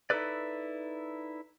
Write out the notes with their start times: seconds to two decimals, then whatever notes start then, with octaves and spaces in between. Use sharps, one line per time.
0.10 D#4 E4 F#4 A4 B4 D5